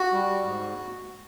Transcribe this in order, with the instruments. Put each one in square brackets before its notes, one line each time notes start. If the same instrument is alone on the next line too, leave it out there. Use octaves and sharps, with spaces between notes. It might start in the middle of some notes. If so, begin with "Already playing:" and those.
Already playing: [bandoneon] F#4
G3
G#2